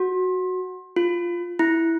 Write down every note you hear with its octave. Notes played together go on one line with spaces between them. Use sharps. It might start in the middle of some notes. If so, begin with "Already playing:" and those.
Already playing: F#4
F4
E4